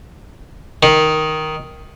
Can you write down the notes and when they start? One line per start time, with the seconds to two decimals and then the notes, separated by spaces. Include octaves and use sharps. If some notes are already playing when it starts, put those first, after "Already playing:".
0.83 D#3